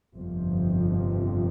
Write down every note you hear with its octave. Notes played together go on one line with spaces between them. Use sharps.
G1 F2 C3 F3